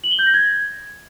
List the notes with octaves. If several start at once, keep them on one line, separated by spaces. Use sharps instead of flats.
F#7
G7
G6
A#6
G#6